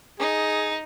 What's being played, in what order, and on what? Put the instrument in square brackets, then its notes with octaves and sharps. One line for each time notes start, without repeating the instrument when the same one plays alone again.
[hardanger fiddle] D#4 [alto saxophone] G#4